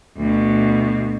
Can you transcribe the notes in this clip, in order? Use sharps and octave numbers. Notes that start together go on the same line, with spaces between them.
D2 B2